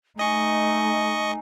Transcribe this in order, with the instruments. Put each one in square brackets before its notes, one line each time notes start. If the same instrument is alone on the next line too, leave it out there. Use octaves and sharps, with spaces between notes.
[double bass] A3 D#4 [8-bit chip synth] D#5 C#6 [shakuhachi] G#5